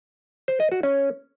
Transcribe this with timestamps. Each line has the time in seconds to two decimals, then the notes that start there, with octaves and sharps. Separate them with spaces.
0.48 C5
0.60 D#5
0.72 F#4
0.83 C#4